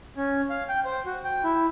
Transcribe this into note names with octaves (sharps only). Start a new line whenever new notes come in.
C#4
F5
G5
C5
F#4
G5
E4